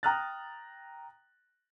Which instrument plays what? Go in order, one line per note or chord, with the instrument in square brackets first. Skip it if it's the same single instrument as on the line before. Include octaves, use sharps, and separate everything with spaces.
[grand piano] G5 A#5 D#6 F6 F#6 A6